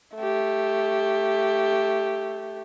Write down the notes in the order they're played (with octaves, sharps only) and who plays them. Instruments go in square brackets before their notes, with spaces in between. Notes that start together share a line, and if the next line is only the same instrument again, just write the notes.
[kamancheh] A3 G4